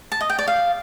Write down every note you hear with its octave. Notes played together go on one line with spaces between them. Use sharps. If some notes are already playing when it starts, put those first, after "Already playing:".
A5
D#5
G5
D5
F5